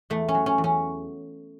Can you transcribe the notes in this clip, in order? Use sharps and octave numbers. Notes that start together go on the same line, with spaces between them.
E2 A3
C#4
F#3
C#4
E2
C#4